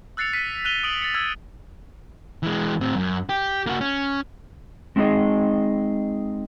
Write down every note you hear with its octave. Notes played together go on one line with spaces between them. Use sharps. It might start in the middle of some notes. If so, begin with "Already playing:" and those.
E6 F#6 A6 C7 C#7 F7
F6 B6 C7 D#7
F6 F#6 D#7 F7 G7
D#6 D7 F#7
A6 C#7
E6 F6 G#6 A6
E3 G#3
A2 C4
F#2
G4
A#3 F#4
C#4
G#3 C4 D4 D#4 G#4 D#5